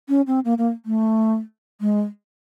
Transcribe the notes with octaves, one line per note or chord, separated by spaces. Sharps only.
C#4
C4
A#3
A#3
A3
G#3